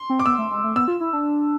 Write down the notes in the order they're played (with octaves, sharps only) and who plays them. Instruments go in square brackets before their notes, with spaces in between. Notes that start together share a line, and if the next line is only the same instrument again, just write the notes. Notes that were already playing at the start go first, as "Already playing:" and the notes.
Already playing: [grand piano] C6
[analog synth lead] C4
[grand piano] D6
[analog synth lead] B3 [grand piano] E6
[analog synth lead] A3
G#3
A3
[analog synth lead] B3 [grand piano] E6
[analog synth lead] F4
E4
D4